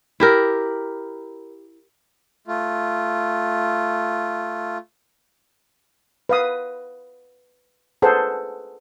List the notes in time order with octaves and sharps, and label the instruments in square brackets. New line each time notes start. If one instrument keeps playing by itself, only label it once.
[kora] E4 G4 A#4
[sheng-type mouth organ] A3 F4
[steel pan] B4 F5 D#6
G#4 A4 B4 C5 F#5